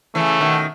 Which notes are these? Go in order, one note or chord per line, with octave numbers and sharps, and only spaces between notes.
C#3 E3 A3
B2 D#3
B2